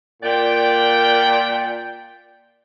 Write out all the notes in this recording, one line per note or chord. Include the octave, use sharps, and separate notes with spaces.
A#2 D5 G5